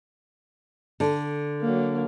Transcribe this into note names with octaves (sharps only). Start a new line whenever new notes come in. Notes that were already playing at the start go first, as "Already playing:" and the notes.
D3
F#3 A#3